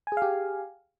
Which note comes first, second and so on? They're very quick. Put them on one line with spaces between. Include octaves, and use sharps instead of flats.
G#5 G#4 F5 G4